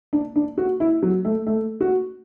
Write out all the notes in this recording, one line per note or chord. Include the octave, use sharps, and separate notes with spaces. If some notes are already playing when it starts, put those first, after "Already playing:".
D4
D4
F#4
E4
F#3
A3
A3
F#4